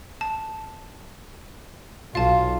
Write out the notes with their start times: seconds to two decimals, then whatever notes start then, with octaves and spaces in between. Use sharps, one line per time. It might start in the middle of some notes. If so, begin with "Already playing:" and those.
0.21 A5
2.15 B1 F4 F5 A5